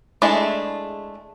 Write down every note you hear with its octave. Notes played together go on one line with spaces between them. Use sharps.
G#3 A3 D4 E4 G#4